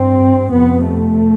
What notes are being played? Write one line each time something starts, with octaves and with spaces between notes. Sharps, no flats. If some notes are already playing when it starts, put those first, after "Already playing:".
Already playing: G2 C4
F2 C3 B3
A3